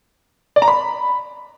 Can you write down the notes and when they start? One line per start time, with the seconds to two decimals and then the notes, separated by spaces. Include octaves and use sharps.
0.56 D5
0.62 A#5
0.68 B5